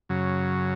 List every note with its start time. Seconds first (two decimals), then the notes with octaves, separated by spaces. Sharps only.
0.09 F#2 C#3 F#3